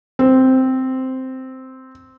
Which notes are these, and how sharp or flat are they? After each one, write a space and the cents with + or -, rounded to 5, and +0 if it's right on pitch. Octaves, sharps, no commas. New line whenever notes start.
C4 -5